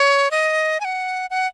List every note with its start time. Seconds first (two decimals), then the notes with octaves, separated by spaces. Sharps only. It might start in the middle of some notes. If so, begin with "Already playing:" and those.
Already playing: C#5
0.31 D#5
0.80 G#5
0.85 F#5
1.30 F#5